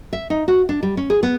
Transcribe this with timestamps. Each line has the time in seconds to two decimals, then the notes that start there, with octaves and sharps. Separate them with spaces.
0.13 E5
0.30 D#4
0.48 F#4
0.69 D4
0.83 G3
0.97 C#4
1.10 G#4
1.23 B3